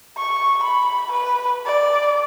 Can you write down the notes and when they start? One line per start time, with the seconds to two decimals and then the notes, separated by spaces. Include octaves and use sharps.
0.18 C#6
0.63 B5
1.12 B4
1.66 D5